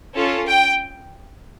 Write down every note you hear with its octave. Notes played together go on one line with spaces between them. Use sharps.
C#4 F4 A4
G5